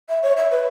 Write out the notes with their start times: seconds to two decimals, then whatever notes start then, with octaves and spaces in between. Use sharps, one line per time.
0.08 E5
0.22 C#5
0.37 E5
0.51 B4